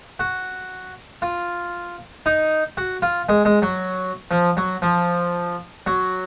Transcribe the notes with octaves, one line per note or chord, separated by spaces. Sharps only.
F#4
F4
D#4
F#4
F4
G#3
G#3
F#3
F3
F#3
F3
F#3